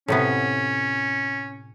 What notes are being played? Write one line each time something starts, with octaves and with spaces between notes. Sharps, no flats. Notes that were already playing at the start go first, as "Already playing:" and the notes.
A2 C3 B3 C#4